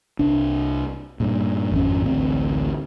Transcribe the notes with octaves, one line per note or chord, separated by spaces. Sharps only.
C2 D4
G2 A#2
G#1 F2 C#4
A1 D2 C4